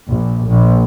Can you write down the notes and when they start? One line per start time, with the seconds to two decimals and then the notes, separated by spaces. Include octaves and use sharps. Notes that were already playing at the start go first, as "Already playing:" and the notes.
0.10 A#1
0.49 A#1